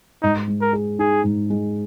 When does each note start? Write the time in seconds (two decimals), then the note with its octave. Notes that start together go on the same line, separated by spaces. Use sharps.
0.22 G#2 D#4
0.48 G#3
0.61 A#4
0.73 G#4
0.99 D#4 G#4
1.24 G#2
1.50 G#3